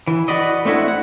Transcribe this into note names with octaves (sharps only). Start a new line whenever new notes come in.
E3
F#4 B4 D5 D#5
A3 C4 D4 E4 F#4
F#5